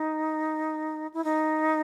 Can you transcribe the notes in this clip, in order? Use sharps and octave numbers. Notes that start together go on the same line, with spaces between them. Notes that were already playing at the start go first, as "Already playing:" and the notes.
Already playing: D#4
E4
D#4